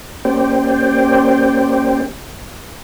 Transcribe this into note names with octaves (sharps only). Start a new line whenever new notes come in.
A#3 C#4 G4 C5 D5 G5